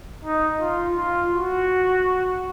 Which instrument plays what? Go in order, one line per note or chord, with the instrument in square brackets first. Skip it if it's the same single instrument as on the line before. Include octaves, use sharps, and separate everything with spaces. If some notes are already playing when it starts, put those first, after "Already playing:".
[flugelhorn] D#4
F4
F4
F#4